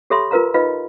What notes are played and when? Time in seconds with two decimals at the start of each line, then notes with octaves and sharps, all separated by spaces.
0.10 G4 A4 C#5 E5 B5 C6
0.31 F4 A#4 B4 F5 A#5
0.54 D#4 F4 B4 D#5 F5 B5